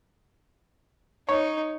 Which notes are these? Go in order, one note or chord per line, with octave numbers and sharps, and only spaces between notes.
D#4 C#5